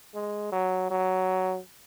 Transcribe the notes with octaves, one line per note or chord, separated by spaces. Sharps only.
G#3
F#3
F#3